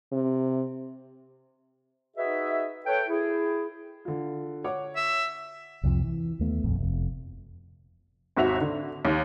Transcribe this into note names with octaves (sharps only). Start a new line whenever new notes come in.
C3
D#4 F#4 G#4 B4 D#5 E5
A4 B4 C#5 G5
E4 G#4
D3 F4
C#5 F#5 D6
E5
C2 F2 C3 F3
E3
D#2 A3 B3
D#1 A#1 F2
F1 F2
G#1 D#2 F#4 E5 F7
D3
D#2